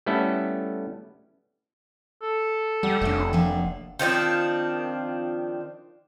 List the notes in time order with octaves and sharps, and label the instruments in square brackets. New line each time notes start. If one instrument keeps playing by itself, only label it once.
[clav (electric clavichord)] G3 A3 B3 C#4 E4 A4
[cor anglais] A4
[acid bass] G3 [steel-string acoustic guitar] F#5
[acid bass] F1 [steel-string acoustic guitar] A3 C#4 D4
[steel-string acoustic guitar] F3 A#3 D4
[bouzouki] D#3 F3 C4 D4